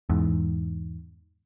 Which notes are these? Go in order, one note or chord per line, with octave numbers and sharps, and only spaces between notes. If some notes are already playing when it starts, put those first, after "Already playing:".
E2 G#2